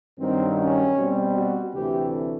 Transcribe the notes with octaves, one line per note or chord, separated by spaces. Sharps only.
G2 D#3 F#3 C4
C#4
B2 G3 C4
F#4
D2 C3 E3 A3 G4